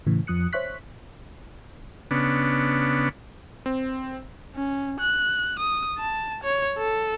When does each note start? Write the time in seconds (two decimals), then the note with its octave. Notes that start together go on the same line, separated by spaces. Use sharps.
0.06 A2 C#3 E3
0.27 F2 F3 D#6 F#6 C#7
0.53 C5 C#5 E5 C#6 F#6 B6
2.11 C#3 B3 D4
3.66 C4
4.55 C#4
5.00 F#6
5.59 D#6
5.99 A5
6.44 C#5
6.78 A4